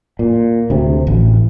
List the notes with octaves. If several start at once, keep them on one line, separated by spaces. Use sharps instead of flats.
A#2
D2 C3
A1